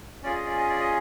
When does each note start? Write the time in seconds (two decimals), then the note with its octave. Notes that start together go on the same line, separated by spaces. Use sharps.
0.23 C#4 F4 G#4 D5
0.35 D#5
0.46 D5
0.58 D#5
0.69 D5
0.80 D#5